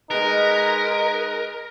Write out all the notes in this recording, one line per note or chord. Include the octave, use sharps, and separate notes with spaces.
G#3 D#4 A#4 B4